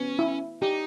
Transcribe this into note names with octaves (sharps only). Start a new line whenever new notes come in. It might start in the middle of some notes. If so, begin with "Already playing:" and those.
Already playing: B3 C#4
E4
D#4 G4